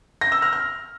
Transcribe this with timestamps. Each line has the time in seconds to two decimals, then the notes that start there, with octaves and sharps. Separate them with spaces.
0.21 A#6
0.32 E6
0.42 F6
0.53 F6